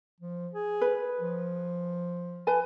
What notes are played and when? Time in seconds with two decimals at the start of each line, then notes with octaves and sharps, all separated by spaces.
0.20 F3
0.53 G#4
0.81 B4
1.21 F3
2.47 B4 G#5 A5